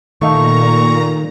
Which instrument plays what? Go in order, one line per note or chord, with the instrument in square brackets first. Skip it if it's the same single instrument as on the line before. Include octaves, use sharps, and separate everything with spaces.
[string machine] A#2 A#5 [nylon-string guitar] D#3 [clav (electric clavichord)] A3 D#4 F5 [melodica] C#6